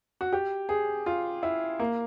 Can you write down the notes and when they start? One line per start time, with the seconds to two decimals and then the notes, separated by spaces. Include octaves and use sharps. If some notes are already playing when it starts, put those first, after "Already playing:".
0.21 F#4
0.33 G4
0.69 G#4
1.06 F4
1.43 E4
1.79 A#3